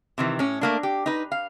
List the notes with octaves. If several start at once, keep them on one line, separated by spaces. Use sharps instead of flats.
C3 D#3 E3
A2 C#4
A3 A#3 D4
G4
D#4 B4
F5